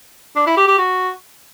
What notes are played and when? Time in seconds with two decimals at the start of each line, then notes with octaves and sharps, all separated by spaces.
0.36 D4
0.46 E4
0.57 G4
0.68 G4
0.78 F#4